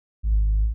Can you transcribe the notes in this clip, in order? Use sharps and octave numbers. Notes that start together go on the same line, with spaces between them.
G#1